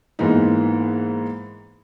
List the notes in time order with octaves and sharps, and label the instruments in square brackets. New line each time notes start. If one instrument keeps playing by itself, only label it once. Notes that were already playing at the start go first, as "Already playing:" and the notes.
[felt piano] G#2 E3 G#3 A#3 B3 D#4